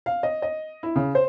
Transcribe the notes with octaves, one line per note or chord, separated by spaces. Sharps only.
F5
D#5
D#5
E4
C#3
C5